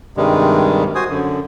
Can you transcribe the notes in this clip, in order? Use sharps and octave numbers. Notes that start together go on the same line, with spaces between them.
G2 C3 D#3 G3 G#3
F#4 C5 G#5 D#6
F#2 D3